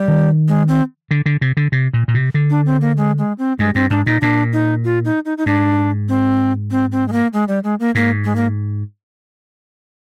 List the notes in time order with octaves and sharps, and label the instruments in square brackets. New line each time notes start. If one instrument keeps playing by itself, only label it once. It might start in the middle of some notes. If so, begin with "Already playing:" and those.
Already playing: [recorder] G3
[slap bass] D#3
[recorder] G#3
C4
[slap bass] D3
D3
C3
D3
C3
A#2
A#2
C3
D3
[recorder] D4
C4
A#3
G#3
G#3
C4
[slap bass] G2 [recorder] G#3
[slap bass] G2 [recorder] C4
[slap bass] G#2 [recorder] D4
[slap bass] A#2 [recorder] D#4
[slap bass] A#2 [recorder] D4
[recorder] D#4
F4
D#4
D#4
D#4
[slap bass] G#2 [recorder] D4
[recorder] C4
C4
C4
G#3
A#3
G#3
G3
G#3
A#3
[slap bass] G#2 [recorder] A#3
[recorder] G#3
A#3